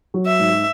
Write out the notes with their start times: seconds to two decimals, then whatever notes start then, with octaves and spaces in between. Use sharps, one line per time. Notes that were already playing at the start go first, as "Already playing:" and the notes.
0.14 F#3
0.26 E5
0.39 G#2